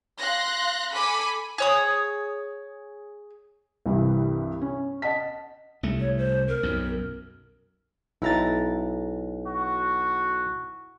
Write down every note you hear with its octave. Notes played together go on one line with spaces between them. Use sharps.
F5 C6 F#6 A#6
A4 G#5 B5 D6 B6
G#4 C#5 D#6
C2 G2 E3
C#4
D#5 F#5 A5 B6
C2 A3
C#5
C5
A#4
B1 F#2
B1 E4 A#5 A6
F#4